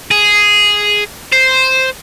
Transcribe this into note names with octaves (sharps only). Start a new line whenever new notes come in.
G#4
C5